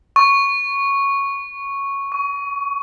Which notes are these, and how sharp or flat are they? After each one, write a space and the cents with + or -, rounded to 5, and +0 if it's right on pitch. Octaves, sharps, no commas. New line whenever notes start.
C#6 -5
C#6 +30